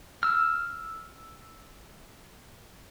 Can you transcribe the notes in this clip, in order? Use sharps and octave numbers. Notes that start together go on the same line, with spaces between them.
E6 F6